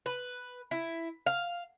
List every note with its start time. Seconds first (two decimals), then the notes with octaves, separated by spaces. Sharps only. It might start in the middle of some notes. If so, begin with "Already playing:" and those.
0.06 B4
0.71 E4
1.26 F5